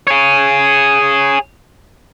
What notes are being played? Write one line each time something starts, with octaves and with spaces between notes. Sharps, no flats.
G#4 C#5